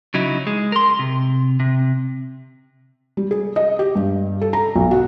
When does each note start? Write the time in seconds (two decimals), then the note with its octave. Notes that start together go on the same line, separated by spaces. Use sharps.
0.14 C#3 F#3 D#4 E4
0.47 G#3
0.72 A#4 C6
0.99 C3
1.60 C3
3.17 G3
3.31 G#4
3.56 D#5
3.79 G4
3.95 G2
4.41 A4
4.53 A#5
4.75 B1
4.91 F#4